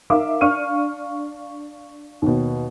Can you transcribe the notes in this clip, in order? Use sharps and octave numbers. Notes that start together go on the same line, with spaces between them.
D#4 A#4 E5 F5 D6
D4 F5 C#6 F6 D#7
D#2 B2